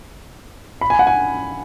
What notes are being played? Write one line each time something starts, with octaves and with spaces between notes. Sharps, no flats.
B5
G#5
F#5
G#5